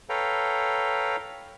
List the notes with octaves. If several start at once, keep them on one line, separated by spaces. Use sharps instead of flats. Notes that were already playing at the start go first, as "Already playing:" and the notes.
A4 B4 C#5 F5 G5 A#5